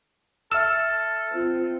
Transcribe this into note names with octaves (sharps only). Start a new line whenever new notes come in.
A4 E5 E6 F6
C4 F4